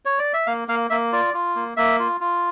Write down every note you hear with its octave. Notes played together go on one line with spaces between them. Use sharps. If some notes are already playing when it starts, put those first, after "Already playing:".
C#5
D5
E5
A#3 F5
A#3 F5
A#3 E5
F4 D5
F4
A#3
A#3 E5
F4
F4